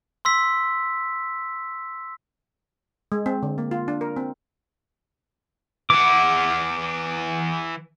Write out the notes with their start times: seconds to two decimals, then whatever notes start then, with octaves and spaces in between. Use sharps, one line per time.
0.25 C6 E6 B6
3.12 G#3
3.26 C4
3.43 D3
3.58 A#3
3.71 F4
3.88 D4
4.01 A#4
4.16 C4
5.90 E3 F#5 D6